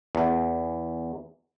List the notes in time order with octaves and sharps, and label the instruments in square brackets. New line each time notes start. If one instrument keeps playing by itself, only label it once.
[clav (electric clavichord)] E2